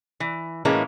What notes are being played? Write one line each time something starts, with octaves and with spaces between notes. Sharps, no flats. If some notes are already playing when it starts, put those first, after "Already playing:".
E3
A2 E3 G#3 A#3 C#4 A#5